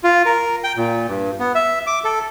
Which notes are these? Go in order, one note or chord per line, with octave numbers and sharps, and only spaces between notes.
F4
A#4
G5
A#2
G2
B3
E5
D6
A4